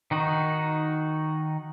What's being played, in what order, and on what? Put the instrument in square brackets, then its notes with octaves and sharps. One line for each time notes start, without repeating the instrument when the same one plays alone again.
[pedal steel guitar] D#3 D#4 F#4